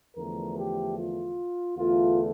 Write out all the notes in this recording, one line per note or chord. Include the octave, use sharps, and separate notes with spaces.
E2 D3 F3 A3 A#4
G4
F4
E2 D3 A3 F4